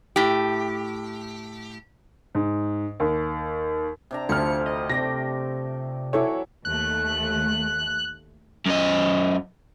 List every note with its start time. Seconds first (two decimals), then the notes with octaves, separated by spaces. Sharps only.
0.16 A2 G4
2.35 G#2
3.00 D#2
4.11 C3 D4 A#5
4.29 D2 C3 F3 F6 C#7
4.66 D#5
4.90 C3 A3 D5 G5 A#6
6.13 E3 F#3 E4 A4 C#5 D6
6.65 D#2 A3 F#6
8.66 F#2 D#5